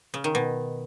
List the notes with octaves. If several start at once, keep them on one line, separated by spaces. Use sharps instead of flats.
C#3
D#3
B2